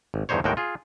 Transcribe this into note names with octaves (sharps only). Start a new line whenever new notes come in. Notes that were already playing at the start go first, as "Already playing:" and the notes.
G#1
E2 G2 D3 D#4 C5 C#5
D#2 A2 G#3 F#4 A#4 G5
F4 G#4